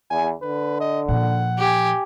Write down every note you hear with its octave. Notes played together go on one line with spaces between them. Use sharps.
E2 G#5
D3 B4
D#5
A#2 F3 F#5
G4 G#5